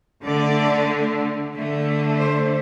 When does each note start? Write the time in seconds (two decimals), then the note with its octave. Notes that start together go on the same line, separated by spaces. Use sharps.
0.24 D3 A3 D5
1.54 D3 A3
2.19 C5